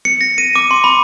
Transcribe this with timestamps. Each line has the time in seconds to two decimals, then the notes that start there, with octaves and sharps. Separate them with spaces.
0.05 C#7
0.21 A#6
0.38 D#7
0.56 D6
0.71 C6
0.84 B5